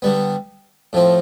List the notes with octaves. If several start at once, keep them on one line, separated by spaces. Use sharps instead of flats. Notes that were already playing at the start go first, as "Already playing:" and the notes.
D3 G3 B3
A2 F3 C4